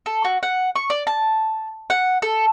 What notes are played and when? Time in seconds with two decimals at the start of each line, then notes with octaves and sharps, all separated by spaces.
0.06 A4
0.25 F#4
0.43 F#5
0.76 C#6
0.90 D5
1.07 A5
1.90 F#5
2.22 A4